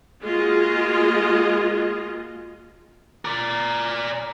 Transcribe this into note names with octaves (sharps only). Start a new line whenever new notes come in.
G#3 A#3 F4 F#4 G#4 D#5
A#4 D5